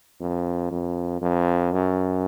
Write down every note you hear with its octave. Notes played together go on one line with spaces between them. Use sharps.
F2
F2
F2
F#2